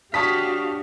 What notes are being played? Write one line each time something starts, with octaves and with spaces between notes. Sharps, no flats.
D4 F#4 G4 C#5 F5 A5 D#6 B6